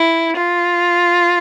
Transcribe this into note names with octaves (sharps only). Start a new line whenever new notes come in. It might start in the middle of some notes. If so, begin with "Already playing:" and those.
Already playing: E4
F4